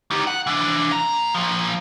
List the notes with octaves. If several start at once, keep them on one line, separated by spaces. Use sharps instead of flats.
D#4 G4
F#5
E3 D4
A#2 A#5
A#2 F3